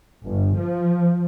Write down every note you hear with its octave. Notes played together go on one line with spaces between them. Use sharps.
G1
F3